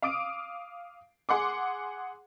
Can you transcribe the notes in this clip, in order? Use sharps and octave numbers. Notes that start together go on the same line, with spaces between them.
F5 D6 D#6 D7
G#4 F#5 C6 D6